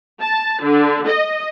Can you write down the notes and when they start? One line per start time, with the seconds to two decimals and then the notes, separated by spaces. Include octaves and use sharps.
0.22 A5
0.64 D3
1.08 D#5